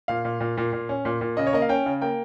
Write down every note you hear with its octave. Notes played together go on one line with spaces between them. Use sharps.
A#2 F5
A#2
A#2
A#2
A#2
C#4
A#2
A#2
C#3 D#5
C#5
A#3 D#5
F5
C#4 G5
C#3
A#3 G5